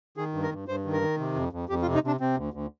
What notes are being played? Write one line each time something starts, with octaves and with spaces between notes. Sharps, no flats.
D#3 G#4
G2
A#4
G2
G2 C5
D#3
A#4
D#3
C3
F2
F2
F2 G4
F4
C3
D#4
C3 D4
C3 C4
D2
D2